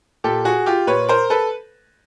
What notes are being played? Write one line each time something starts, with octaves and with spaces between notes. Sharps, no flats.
A#2 G4 A4
F#4 G#4
F4 G4
A#2 B4 C#5
A#4 C5
A4 B4